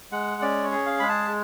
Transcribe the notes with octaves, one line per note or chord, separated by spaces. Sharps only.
G#3 F#5
C#4 D5
C#5
G#4
F5
G#3 B5
A5